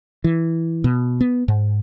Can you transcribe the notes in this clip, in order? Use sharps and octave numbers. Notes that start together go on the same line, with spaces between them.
E3
B2
B3
G#2